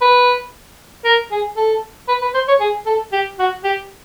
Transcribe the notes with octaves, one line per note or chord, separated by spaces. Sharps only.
B4
A#4
G#4
A4
B4
B4
C5
C#5
G#4
A4
G4
F#4
G4